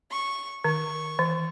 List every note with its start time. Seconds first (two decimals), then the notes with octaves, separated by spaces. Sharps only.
0.11 C#6
0.64 D#3 C#6
1.19 E3